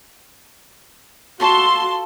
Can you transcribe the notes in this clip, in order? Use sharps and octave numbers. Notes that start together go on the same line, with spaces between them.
F4 F#4 A4 A5 C6 C#6